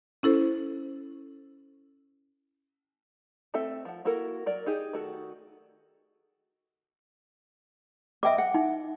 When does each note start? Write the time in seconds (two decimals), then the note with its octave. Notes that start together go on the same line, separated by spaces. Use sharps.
0.23 C#4 E4 A4 C5
3.54 A3 C4 A4 E5
3.85 F3 F#5
4.05 A#3 E4 F#4 A4 A#4
4.46 F#3 A#4 D5
4.66 D#4 G4 G#4
4.93 D#3 A3 F#4 A4
8.23 D#5 E5 G5 D6
8.38 F#5
8.54 D#4